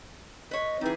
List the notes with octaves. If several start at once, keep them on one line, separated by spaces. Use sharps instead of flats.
B4 C#5 D#5
E3 G3 C4 D#4 G#4